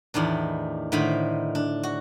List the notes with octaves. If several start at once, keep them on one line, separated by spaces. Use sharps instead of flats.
E2 A2 D#3 D4
A2 D3 D#3 C5 B5
D4
F#4